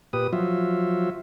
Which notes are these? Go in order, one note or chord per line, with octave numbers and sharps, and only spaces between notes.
A#2 G4 B4 D#6
F3 F#3 F4 E5